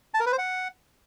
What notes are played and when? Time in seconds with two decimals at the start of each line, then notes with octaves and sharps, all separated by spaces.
0.14 A5
0.20 A#4
0.26 B4
0.32 C5
0.38 F#5